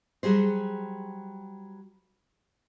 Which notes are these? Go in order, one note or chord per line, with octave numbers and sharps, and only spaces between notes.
F#3 G3 F#4 G#4 C5